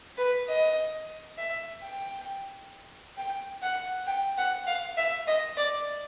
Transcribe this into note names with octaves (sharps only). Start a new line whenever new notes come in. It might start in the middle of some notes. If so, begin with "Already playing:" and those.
B4
D#5
E5
G5
G5
F#5
G5
F#5
F5
E5
D#5
D5